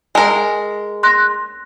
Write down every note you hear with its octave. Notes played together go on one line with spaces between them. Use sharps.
G#3 A#4
C6 F#6 A#6